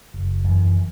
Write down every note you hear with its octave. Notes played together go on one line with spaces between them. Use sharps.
F#1
F#2 E3